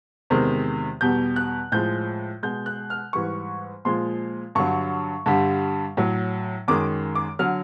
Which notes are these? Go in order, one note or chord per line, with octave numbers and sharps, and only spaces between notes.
E2 C3 D#3 G#3
E2 B2 G3 G6
F#6
A2 F3 G#3 G6
B2 G#3 G6
F#6
F6
G#2 E3 G3 C#6
A#2 F3 G#3 C6
G2 D3 F#3 C#6
G2 D3 G3
A2 F#3
F#2 D#3 G#3 D6
D6
D3 F#3 F6